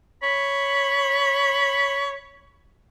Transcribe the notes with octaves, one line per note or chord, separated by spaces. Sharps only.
C#5 B5